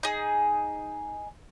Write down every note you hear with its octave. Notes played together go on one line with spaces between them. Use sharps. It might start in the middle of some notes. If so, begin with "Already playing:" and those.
D#4 G#4